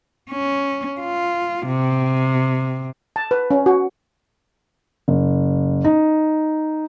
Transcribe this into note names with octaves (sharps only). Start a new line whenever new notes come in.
C#4
F4
C3
A5
B4
C#4
F#4
F#1
D#4